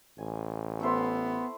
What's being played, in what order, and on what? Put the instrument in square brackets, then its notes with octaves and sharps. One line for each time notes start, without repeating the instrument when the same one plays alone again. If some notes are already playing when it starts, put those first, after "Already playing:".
[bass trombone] A1 [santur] G#5
[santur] A3 E4 C5 [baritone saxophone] B3